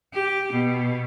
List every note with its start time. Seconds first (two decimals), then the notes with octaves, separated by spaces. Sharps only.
0.12 G4
0.52 B2